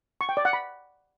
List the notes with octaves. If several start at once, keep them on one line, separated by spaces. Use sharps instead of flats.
C#6
G5
D5
F#5
B5